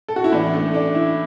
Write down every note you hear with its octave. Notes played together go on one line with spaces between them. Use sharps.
A4
F#4
E4
A2 E3 D4
A3
D4
E4